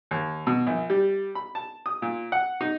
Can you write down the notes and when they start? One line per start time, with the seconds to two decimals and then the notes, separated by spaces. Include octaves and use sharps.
0.11 D#2
0.47 B2
0.67 A#1
0.90 G3
1.35 B5
1.55 A5
1.86 D#6
2.02 A#2
2.32 F#5
2.61 D#4